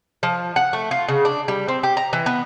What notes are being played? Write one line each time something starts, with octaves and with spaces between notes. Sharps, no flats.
F3
F#5
A3
F4
C#3
D4
G3
C4
G4
A#5
E3
B3